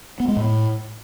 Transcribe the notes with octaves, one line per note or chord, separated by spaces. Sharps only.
B3
G#3
A2